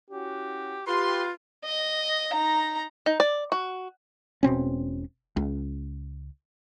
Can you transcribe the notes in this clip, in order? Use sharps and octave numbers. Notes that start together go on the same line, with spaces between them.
C#4 E4 F#4 G4
F4 G4 B4 C6
D#5
D#4 A#5
D#4
D5
F#4
E1 B2 C4 C#4
C#2